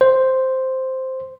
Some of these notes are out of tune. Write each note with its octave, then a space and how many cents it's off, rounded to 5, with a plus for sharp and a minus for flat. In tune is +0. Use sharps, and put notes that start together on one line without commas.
C5 +0